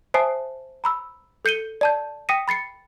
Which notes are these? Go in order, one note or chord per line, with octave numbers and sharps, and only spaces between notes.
C5 E5 G#5 A5 D#6 C7
A#5 B5 E6
A4 G6 C#7 D#7 G7
D5 A5 G6
G5 D#6 A#6 B6 C#7 D#7
B5 A6 C7 C#7